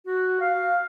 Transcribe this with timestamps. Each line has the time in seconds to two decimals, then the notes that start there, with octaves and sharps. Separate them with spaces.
0.07 F#4
0.41 F5